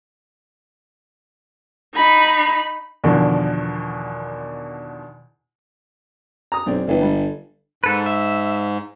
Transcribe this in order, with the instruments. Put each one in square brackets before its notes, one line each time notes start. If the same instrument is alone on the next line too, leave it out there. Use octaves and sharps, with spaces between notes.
[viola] D#4 B5
[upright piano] E2 B2 D3 D#3 F3
[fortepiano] A#5 D#6
[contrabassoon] B1 [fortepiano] F#2 C4 D5
[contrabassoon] G1 [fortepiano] E3 B3
[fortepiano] G3
[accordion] G#2 [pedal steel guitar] A4 B4
[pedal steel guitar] E5